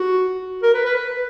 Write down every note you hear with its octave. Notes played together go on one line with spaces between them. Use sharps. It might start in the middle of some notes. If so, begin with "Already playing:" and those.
Already playing: F#4
A#4
B4
B4
B4